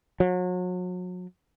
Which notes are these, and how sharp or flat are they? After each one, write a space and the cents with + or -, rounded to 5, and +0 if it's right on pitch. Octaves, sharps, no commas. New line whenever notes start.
F#3 -35